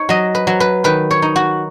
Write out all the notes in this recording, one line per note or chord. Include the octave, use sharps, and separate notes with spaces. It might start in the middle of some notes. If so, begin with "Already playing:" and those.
Already playing: D#4 C#5
F#3 D#5
B4
F#3
B4
D#3 B4
C#5
D#4
F#4